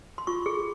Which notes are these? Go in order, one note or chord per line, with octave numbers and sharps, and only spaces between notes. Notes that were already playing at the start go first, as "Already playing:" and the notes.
C6
F4 C#6
G#4